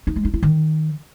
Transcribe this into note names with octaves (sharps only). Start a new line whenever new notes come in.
D#4
G#3
D#4
E4
D#3